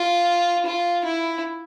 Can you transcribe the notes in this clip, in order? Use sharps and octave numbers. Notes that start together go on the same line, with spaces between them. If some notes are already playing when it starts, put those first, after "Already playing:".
Already playing: F4
F4
E4